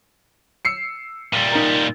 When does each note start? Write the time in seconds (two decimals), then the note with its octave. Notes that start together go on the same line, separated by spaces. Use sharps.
0.65 E6 C7 C#7
1.33 A#2 G3
1.52 D#4 A#4